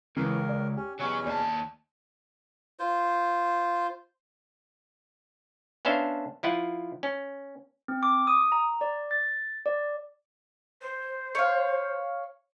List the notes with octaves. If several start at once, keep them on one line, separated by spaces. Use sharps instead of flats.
C#2 E3 A#4
D5
C#4 G4
E2 B2 F#3 C#4 F#4
D#2 D5 A5
F4 C5
B3 C#4 D4 C5 E5 F5
F3 E4 F4 F#5
C#4
C4
D6
D#6
A#5
D5
A6
D5
C5
C#5 F5